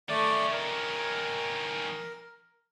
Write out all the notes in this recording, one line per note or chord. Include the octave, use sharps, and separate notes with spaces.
D#3 A3 C#4 D5
A#4